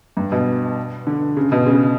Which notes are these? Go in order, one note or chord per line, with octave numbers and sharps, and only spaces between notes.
G2
B2
D3
C#3
B2
C#3